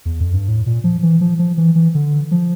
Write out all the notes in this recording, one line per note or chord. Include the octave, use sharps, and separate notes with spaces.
E2
F2
G2
A2
A#2
F3
E3
F3
F3
E3
E3
D3
F3